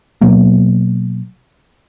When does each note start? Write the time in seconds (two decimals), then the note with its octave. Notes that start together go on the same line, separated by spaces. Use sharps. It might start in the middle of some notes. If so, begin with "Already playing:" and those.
0.21 B2 F#3 A#3